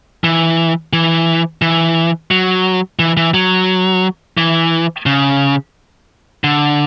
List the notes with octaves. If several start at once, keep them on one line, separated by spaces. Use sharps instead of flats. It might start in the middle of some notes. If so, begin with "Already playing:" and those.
E3
E3
E3
F#3
E3
E3
F#3
E3
C#3
D3